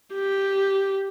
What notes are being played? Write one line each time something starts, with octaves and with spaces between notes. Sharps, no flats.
G4